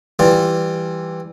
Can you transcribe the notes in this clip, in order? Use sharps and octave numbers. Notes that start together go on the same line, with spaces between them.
E3 G3 F4